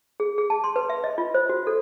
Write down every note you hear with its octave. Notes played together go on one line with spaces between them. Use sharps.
G#4
G#4
A5
C6
B4
E5
D#5
F4
C5
F#4
A4